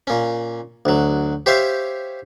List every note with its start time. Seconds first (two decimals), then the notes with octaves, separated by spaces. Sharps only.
0.07 A#2 C#4
0.85 D2 F#3
1.46 G4 C5 C#5 E5 F5